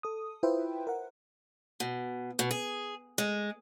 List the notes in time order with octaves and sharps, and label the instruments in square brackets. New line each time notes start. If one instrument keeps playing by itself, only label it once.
[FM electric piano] A4 D#6
E4 F4 B4 C5 E5 G5
A#4 F#5
[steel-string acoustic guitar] B2
B2
G#4
G#3